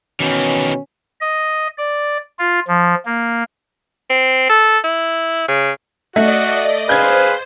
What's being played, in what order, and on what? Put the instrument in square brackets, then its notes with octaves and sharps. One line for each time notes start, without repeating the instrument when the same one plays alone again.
[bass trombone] B2 [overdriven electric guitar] D#3 E3 [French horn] C#4
[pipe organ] D#5
D5
F4
F3
A#3
[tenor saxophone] C4
A4
E4
C#3
[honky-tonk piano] A3 [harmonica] F#4 [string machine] D5 D#5
[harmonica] G#4 B4 F5 [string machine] C5 [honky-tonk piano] G6 G#6